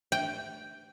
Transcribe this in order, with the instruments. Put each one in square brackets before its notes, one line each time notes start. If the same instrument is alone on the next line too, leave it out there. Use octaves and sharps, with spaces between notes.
[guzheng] G5